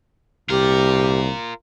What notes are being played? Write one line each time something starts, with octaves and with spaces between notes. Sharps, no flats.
C2 F4 G4 A#4